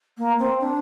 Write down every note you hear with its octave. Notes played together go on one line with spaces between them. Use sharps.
A#3
C4
D4